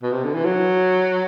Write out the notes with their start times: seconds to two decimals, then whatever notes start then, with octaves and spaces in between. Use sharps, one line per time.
0.03 B2
0.12 C3
0.24 D3
0.34 E3
0.45 F#3